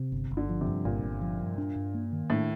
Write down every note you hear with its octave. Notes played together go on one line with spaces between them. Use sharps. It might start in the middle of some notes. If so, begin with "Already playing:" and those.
Already playing: C3
G1
G1
D3
F3
C3
G2
G1 A#2
G1
F3
G2
D4
G2
A#3
D#3
A2 D4